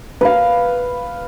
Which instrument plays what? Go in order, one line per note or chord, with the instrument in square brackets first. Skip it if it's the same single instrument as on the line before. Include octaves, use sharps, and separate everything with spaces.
[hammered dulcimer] B4 F5